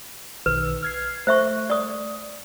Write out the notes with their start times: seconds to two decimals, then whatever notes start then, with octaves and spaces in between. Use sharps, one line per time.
0.46 B1 D#3 B4 E6
0.83 F6 G#6 C7
1.27 A3 C5 E5 C#6
1.70 D5 D#6